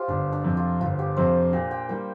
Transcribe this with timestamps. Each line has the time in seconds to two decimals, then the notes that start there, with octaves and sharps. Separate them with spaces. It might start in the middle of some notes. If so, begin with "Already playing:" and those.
Already playing: F4 G4 C5
0.08 G1 D4
0.32 D4
0.44 F2 C3
0.57 F4
0.80 G1 F4
0.99 G4
1.17 F2 C3 C5
1.53 A#2 G5
1.71 G5
1.89 G3 A#3 G5